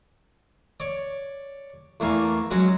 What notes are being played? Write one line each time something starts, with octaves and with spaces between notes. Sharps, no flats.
C#5 D5
E2 A3 A#3 F5 G#5
F#3 G#3 C#4 F#4